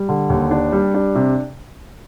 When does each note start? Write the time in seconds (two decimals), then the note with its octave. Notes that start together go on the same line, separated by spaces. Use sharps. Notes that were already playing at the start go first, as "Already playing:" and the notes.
Already playing: G3
0.09 D3
0.29 D#2
0.51 D4
0.72 G3
0.94 D4
1.15 C3